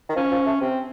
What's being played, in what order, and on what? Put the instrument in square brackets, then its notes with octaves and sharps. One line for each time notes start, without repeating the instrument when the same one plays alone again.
[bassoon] D#3
[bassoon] F3 [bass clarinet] C#4
[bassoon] F3
A3
[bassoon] C3 [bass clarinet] C4